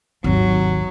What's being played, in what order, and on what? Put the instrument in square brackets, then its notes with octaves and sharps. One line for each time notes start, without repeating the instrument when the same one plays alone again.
[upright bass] G#1 D#2 [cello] F#3